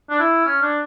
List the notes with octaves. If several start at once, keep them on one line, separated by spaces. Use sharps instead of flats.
D4
E4
C#4
D4